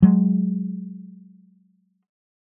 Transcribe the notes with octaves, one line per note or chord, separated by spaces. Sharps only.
F#3 G#3